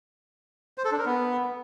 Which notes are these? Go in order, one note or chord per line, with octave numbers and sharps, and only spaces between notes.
C5
A4
D4
A#4
B3